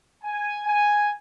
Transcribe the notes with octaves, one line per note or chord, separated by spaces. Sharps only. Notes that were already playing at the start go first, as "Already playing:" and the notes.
G#5
G#5